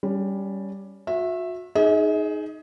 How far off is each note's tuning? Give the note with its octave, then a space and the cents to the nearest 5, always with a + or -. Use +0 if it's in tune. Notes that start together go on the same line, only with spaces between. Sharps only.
G3 +0 C#4 +20
F#4 -40 E5 +0
D#4 +0 G#4 +15 D#5 +45